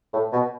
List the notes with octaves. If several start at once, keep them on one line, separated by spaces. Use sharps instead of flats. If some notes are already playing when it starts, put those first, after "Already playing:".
A2
B2